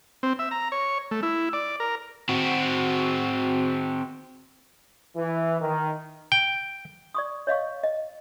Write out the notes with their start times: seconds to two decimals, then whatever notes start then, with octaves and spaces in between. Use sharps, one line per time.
0.23 C4
0.39 E5
0.51 A#5
0.72 C#5
1.11 A3
1.23 E4
1.53 D5
1.80 A#4
2.29 C4 F#4
5.16 E3
5.61 D#3
6.32 G5
7.15 D5 C#6 D#6
7.47 C#5 D#5 F5 C#6
7.84 D#5